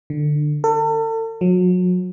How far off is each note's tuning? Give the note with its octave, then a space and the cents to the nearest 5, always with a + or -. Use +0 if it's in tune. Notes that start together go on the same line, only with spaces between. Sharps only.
D3 +20
A4 +40
F#3 -35